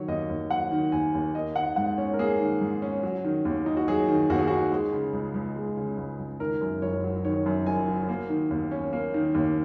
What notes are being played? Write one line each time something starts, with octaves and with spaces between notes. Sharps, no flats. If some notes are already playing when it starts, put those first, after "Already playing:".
Already playing: D#3 F#3 C#5
D#2 D#5
D#2
F#3 F#5
D#3
D#2 G#5
D#2
A#3 D#5
D#3 F#5
G#2 F#5
C#4 C#5
A#4
A#3 G#4
D#3
G#2
C#4
F#3
D#3
D#2
D#4
F#4
F#3 G#4
D#3
D#2 F#4
G#4
D#4 F#4
G#3 G#4
C#3
C#2
C#2
G#3
C#3
C#2
C#2
D#3 A#4
F#2
F#1 C#5
F#3
D#3 C#5
F#2
F#1 G#5
F#3
A#3
D#3
D#2
C#4
A#3
D#3
D#2